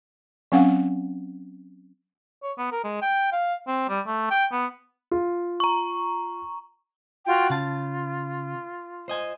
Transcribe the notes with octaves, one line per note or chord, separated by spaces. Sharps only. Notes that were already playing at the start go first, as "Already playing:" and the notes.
F#3 C4 C#4 F5 F#5
C#5
B3
A#4
G#3
G5
F5
C4
G3
A3
G5
B3
F4
A#5 C#6
F4 F#4 G5
C#3 F4 A5
C5 D#5 G#5